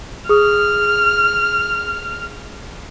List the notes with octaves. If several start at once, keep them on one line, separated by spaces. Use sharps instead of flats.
G#4 D#6 F6